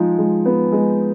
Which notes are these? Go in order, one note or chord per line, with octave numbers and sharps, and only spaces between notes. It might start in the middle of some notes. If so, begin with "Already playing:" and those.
Already playing: F3 G#3 D#4
G#3
B3
G#3